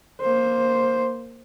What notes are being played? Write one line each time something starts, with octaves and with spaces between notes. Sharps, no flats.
A#3 C5